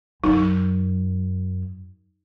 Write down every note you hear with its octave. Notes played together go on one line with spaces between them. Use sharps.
F#2 D#4